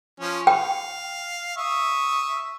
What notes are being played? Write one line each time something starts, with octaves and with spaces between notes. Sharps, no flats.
F3 C#4
F5 G5
E5 C#6 D#6